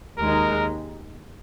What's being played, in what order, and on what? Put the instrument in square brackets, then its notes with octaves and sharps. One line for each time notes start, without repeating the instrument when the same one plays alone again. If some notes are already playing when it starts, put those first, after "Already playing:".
[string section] D#2 D#3 G#3 D#4 [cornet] A#4